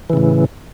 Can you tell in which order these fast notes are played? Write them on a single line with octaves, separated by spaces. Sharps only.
E3 C#3 A2